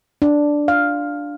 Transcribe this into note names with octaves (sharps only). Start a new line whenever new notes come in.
D4
F5